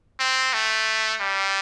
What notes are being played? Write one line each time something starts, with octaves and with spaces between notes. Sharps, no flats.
C4
A3
G3